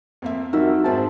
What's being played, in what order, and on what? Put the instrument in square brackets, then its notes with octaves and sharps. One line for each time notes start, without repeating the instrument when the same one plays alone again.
[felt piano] F2 A#3 E5
[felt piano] F2 G3 E6 [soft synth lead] D#4 [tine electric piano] F#4 A#4 E5
[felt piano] G#2 C4 G#4 [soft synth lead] A5